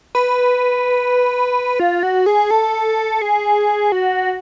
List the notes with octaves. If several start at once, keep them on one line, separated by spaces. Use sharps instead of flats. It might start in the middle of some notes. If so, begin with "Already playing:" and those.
B4
F4
F#4
G#4
A4
G#4
F#4